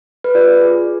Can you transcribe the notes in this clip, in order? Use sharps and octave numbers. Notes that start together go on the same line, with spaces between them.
B4
F4 D5
G#4